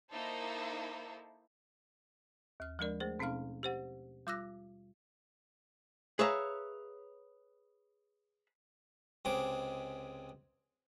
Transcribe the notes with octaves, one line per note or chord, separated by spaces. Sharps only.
A#3 D#4 E4 A4 C5
D#2 F6
F3 G#3 D4 A#4 D5
A3 G#4 C5
B2 C4 C#4 D#4 F5 F6
G4 C5 F#5
G3 F4 D6 E6 F#6 A#6
G#4 B4 C#5 E5 F5 A#5
C#2 C3 G#3 D6